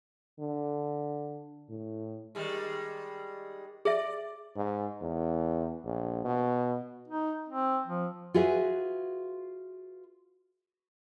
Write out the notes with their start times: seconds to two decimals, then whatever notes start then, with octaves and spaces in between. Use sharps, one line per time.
0.40 D3
1.70 A2
2.35 D#3 G3 G#3
3.85 G#4 D5 E5
4.56 G#2
5.02 E2
5.84 A#1
6.24 B2
7.08 D#4
7.49 C4
7.87 F3
8.34 F4 F#4 G#4 B4 E5